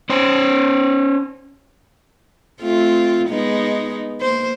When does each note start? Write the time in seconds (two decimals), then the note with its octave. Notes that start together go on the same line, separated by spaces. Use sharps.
0.10 C#4 C5
2.62 A3 C4 F4
3.29 G#3 B3 D#4
4.21 A#3 C5